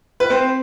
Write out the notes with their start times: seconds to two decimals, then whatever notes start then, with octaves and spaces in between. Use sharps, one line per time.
0.20 B4
0.30 C4 C5